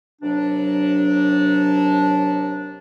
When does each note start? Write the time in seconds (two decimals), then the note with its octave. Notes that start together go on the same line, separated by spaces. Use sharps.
0.22 D#2 C3 F#3 D4